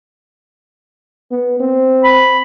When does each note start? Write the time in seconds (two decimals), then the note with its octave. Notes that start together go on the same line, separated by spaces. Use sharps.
1.31 B3
1.60 C4
2.04 B5